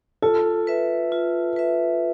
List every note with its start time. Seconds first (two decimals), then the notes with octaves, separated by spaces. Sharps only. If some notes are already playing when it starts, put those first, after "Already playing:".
0.22 F4 A4
0.67 B4 E5
1.12 F4
1.56 B4 E5